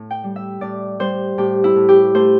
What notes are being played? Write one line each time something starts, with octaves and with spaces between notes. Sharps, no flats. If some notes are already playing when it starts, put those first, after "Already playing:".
Already playing: A2
G5
G3
E5
A2 D5
G3 C5
A2 G4
E4
A2
G4
A3 C5